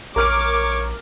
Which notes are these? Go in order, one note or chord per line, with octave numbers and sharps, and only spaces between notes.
A#1 A#4 C#5 D6 F6 D7